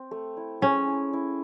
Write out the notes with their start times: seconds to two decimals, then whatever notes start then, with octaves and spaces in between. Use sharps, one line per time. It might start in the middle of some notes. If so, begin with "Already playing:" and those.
Already playing: C4
0.11 A3
0.37 E4
0.62 C#4 G#4
0.87 E4
1.13 E4